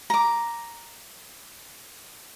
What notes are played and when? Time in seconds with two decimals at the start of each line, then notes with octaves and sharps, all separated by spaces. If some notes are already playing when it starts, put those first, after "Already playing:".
0.10 A#5 D6